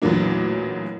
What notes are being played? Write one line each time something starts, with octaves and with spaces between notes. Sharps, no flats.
A1 E2 A#2 F#3 A#3 D4